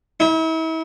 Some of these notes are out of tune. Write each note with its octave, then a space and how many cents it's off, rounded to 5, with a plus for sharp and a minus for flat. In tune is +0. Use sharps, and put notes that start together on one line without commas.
E4 -40